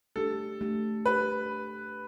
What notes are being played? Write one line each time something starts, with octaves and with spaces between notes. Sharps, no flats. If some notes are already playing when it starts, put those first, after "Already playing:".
A3 D4 G4 A4
A3 D4 G4
A3 D4 G4 B4